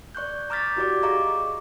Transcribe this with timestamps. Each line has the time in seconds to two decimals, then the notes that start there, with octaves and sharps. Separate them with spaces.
0.15 D5 C#6 F#6 G6
0.50 A#5 D6 F6 G6 A6 B6
0.76 E4 F#4 G4 D5 D6
1.02 G#4 D#5 F5 A#5 C#6 D6